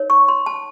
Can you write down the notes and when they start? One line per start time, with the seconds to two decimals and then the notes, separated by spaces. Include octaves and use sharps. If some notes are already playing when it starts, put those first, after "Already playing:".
Already playing: D#4 A#4 C#5
0.10 C#6
0.28 C6
0.46 A5